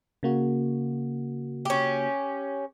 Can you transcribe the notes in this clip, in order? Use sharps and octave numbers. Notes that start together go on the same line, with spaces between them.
C#3 A#3 F#4
C#4 G4